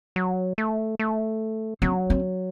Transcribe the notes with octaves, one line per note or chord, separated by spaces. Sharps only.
F#3
A3
A3
F#3 C4
C4